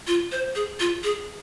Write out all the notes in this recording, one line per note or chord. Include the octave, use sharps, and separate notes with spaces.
F4
C5
G#4
F4
G#4